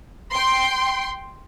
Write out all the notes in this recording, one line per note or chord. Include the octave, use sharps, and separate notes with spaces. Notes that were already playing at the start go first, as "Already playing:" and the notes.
G5 C6